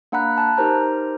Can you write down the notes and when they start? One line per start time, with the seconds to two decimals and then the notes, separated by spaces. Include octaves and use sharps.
0.12 A#3 D4 F#5 A#5 B5 F#6
0.38 A5 F#6
0.57 D#4 G4 A#4 C5 A#5